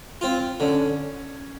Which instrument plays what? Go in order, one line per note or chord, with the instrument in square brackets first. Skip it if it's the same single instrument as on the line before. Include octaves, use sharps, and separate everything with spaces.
[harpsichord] C4 F4
[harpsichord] D3 [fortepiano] C#4